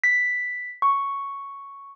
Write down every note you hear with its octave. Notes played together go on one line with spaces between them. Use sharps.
B6
C#6